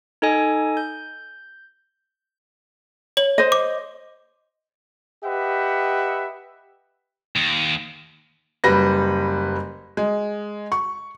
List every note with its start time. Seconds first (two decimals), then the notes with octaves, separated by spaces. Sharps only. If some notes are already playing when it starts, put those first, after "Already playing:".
0.22 D#4 A4 D#5 G#5
0.77 G6
3.17 C#5 F#7
3.38 C5 D#5
3.52 D6
5.24 G4 B4 D#5 E5 F#5
7.36 D#2
8.64 F#1 G3 B4 A#6
9.97 G#3
10.72 C#6